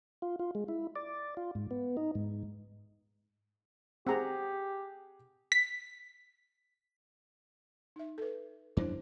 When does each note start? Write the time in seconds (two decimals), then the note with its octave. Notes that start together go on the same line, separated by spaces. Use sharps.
0.22 F4
0.39 F4
0.55 G#3
0.68 E4
0.96 D5
1.37 F4
1.55 G#2
1.71 B3
1.97 D#4
2.15 G#2
4.07 C4 G4 G#4 F#5 A#5
5.52 B6
7.96 D#4 E5
8.18 A4 B4
8.77 F#2 F3 D4 E4 C5